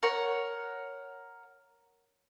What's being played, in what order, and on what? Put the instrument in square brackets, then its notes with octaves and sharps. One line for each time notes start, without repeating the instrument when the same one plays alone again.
[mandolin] A#4 C#5 F#5